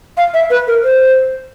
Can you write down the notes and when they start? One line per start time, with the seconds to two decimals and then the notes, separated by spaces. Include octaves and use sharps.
0.17 F5
0.34 E5
0.50 B4
0.67 A#4
0.84 C5